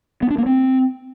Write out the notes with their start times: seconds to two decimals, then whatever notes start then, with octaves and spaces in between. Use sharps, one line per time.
0.22 B3
0.30 D4
0.38 A#3
0.46 C4